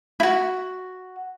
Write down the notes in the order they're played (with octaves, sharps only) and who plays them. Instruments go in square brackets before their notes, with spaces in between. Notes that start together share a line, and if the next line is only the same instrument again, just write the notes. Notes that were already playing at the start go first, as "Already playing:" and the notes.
[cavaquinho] E4 F#4